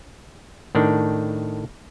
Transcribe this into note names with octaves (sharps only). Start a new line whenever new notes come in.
A2 D#3 D4